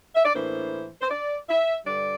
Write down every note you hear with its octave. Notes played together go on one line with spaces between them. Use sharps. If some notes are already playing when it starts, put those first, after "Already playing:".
E5
D5
A2 E3 A#3 D4 C5
C5
D5
E5
G2 D3 G3 D5